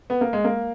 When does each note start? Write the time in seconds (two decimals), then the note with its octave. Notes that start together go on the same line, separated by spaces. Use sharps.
0.10 B3
0.21 A#3
0.33 G#3
0.44 A#3